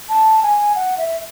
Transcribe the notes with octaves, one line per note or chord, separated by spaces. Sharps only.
A5
G#5
F#5
E5